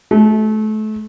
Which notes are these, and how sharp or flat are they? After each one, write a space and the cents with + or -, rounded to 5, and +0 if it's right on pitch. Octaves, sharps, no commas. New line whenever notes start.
A3 -30